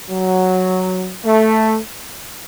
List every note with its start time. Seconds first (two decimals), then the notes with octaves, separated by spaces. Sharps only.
0.09 F#3
1.25 A3